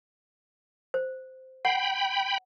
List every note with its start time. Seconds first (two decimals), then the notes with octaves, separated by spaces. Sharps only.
0.94 C5
1.65 F#5 G5 B5